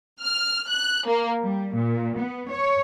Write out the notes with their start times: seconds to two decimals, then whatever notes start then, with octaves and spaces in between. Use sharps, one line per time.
0.21 F6
0.68 F#6
1.05 A#3
1.41 G3
1.74 A#2
2.17 B3
2.50 C#5